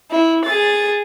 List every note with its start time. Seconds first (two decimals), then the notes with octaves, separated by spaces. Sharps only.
0.10 E4
0.44 G#4 A6